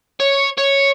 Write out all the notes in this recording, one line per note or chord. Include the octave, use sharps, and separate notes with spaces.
C#5
C#5